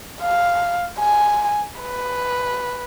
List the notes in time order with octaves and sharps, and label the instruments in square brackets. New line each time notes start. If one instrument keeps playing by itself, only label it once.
[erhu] F5
G#5
B4